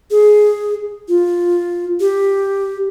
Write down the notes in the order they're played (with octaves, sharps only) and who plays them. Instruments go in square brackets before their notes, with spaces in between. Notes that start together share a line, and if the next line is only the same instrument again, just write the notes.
[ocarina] G#4
F4
G4